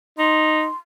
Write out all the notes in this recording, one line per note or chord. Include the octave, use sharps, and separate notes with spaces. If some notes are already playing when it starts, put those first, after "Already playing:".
D#4 C6